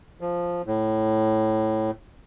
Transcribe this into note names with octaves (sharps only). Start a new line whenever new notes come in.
F3
A2